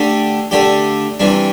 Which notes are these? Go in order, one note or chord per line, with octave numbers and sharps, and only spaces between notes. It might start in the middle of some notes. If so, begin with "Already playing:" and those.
Already playing: D3 A3 D4 G4
D3 A3 D4 G4
C3 E3 G3 D4